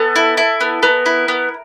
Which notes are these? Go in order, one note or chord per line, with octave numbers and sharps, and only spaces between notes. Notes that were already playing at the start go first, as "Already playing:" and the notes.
Already playing: B3 A4
E4
E4
B3
B3 A#4
E4
B3